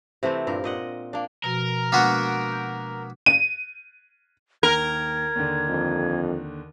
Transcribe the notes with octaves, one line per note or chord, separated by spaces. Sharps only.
C3 E3 A3 C4
G2 A#2 A#4
A#2 D#5 F#5
A#3 D4
B2 F3 F#4 A#4
G#3 A#3 B3 D4 F#4
G6
D#7
D#2 A#4 G#6
D#2 D3
F2